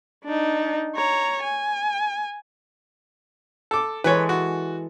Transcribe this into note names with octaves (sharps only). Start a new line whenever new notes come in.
D4 D#4
C#5 A#5
G#5
A4 D6
E3 G#3 A4 B4 C#5
F#4